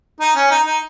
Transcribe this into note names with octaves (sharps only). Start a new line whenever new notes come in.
D#4
C#4
D#4
D#4